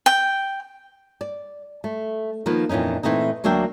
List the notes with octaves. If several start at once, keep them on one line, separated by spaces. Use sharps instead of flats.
G5
D5
A3
D#3 F3 A#3 B3 B4
F2 A#2 E3 C#4 D#4
A#2 E3 A3 C4 D#4
D2 F#3 A#3 D4 E5 G5